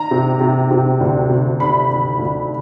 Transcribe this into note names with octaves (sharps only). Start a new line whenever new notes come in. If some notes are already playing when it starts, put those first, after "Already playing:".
Already playing: D#3 A#5
C3
C3
C3
D2
C3
D#3 B5
D#3
D2